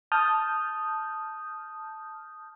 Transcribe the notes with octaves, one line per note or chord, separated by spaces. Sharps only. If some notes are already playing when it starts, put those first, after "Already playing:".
A5 D#6 F6 G6